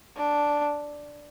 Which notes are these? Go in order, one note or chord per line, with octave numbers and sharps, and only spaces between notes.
D4